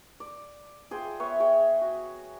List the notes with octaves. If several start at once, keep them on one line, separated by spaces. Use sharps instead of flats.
D5
F4 G#4 C5 G5
B3 C#5 E5
G#4 C#5 G5
F#4